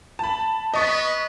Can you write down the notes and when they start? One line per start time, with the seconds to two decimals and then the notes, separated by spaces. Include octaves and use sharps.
0.19 A5 B5
0.74 B3 D#5 C#6